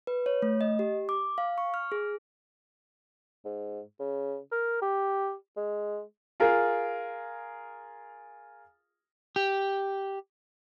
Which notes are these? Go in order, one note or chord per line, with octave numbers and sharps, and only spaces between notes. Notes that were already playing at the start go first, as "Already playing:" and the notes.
B4
C#5
A3
D#5
G4
D6
F5
C#6
F6
G#4
G#2
C#3
A#4
G4
G#3
F4 G#4 A#4
G4